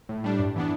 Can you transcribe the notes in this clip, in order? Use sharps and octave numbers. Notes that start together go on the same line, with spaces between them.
A2
G3 D4
G2
E3 B3 D4